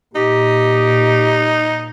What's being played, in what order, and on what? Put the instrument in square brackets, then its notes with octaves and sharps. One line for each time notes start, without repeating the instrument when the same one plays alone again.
[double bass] A#2 [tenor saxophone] D#4 [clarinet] G4